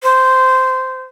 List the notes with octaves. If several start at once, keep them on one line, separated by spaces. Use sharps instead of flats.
C5